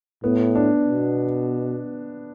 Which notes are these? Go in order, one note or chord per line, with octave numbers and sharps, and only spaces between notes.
A2 B3
D4
B2